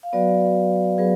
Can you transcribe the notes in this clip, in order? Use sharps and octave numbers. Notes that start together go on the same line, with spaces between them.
F5
F#3 B3 F#4 B4 D5
F#3 B3 G#4 B4